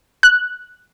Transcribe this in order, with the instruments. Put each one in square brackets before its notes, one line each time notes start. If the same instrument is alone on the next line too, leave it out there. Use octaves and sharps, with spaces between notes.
[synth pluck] F#6